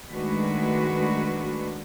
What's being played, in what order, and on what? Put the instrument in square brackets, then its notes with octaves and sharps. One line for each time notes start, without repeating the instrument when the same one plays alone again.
[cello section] D#3 G#3 A3 D4 F#4 B4